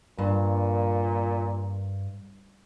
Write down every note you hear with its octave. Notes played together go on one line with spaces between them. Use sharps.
G2 A#2